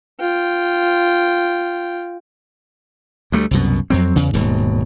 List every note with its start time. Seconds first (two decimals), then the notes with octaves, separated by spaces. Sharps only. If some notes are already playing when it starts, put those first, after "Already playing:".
0.20 F4 G5
3.32 D2 G3 A3
3.51 C2 F#2 B2
3.90 F2 F#3 C4
4.16 E2 C#3
4.33 D#1 G#2 B2